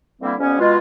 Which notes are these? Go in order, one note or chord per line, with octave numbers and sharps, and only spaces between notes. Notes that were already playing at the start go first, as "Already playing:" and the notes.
D3 E3 G3 A#3 C4 E4
F2 G3 B3 C#4
B2 G#3 F4